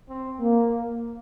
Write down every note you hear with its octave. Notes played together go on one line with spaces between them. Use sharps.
C4
A#3